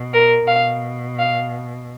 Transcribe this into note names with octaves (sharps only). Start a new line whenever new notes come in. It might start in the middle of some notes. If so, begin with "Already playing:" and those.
Already playing: B2
A#4
B2 F5
F5